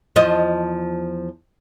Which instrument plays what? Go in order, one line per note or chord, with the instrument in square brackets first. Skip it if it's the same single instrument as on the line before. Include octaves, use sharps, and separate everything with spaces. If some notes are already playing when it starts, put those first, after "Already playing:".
[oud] E2 F3 D#5